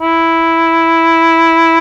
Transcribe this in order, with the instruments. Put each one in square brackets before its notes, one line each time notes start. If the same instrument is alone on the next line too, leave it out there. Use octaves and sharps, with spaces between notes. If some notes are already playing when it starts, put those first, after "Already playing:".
[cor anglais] E4